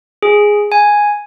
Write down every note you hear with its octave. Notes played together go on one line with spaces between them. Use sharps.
G#4
G#5